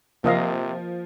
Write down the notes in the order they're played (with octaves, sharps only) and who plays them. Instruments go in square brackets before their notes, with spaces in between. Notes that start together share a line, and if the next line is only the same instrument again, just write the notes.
[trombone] C3 [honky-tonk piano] F3 [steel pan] A#3 D#5 F5